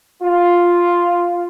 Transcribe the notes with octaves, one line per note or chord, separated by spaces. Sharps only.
F4